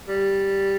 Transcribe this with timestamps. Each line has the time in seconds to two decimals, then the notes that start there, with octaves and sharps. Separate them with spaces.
0.08 G3